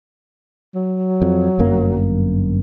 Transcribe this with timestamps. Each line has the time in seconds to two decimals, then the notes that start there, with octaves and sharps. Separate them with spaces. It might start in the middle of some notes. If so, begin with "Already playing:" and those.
0.75 F#3
1.22 F2
1.59 G1 F#2 A#3